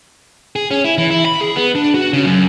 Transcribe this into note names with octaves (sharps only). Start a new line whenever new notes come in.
G#4
C#4
E4
E3
E4
B5
G#4
B3
D4
F#4
C#3
F#2